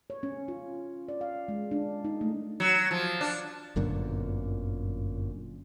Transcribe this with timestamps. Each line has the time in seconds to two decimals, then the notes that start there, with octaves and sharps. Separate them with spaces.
0.10 C#5
0.23 C#4
0.48 F4
1.09 D5
1.21 F5
1.48 G#3
1.71 D4
2.05 D#4
2.21 A3
2.60 F#3
2.91 F3
3.21 D4
3.76 G1 F#2 A#2 D3